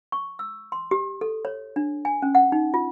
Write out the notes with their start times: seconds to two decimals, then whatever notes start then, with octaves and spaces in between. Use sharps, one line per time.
0.12 C#6
0.39 E6
0.72 C6
0.91 G4
1.21 A4
1.45 C#5
1.76 D4
2.05 G#5
2.22 C#4
2.35 F#5
2.52 D#4
2.74 F4